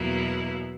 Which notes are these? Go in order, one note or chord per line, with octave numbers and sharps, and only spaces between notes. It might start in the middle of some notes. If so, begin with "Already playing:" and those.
Already playing: E2 B2 F#3 A#3 E4